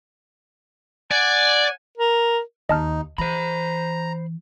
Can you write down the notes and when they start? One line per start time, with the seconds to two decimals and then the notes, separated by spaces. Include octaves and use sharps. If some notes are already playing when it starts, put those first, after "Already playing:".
1.11 D5 F#5 G#5
1.97 A#4
2.69 D#2 D#4 D#5 A5 F6
3.18 E3 C5 A#5 B5